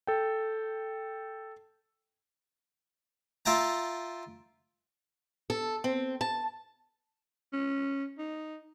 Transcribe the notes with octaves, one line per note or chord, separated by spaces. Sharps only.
A4 G5
F4 E5 G5 A5 A#5
A4
C4
A5
C#4
D#4